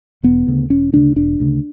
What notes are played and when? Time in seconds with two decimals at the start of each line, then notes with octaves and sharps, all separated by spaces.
0.23 E1 B3
0.47 D2 C#3
0.70 E1 C#4
0.93 D2 C#3 D4
1.16 E1 D4
1.40 D2 C#3